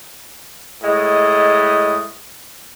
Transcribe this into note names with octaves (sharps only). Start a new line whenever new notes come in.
A2 G#3 D#5